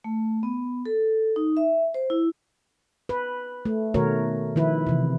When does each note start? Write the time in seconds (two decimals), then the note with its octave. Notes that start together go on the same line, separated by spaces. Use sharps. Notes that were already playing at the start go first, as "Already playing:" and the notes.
0.04 A3
0.43 B3
0.86 A4
1.36 D#4
1.57 E5
1.94 C5
2.10 E4
3.09 B4
3.65 A3
3.94 B2 D#3 A3 F#4 A#4 C#5
4.56 D#3 F3 E4 B4
4.87 C3 E3